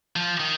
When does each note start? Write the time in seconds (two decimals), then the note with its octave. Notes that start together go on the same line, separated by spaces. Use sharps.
0.16 F3
0.40 D#3